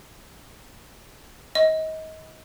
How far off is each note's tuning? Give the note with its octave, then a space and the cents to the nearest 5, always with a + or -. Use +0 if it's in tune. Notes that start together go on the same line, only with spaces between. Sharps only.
D#5 +30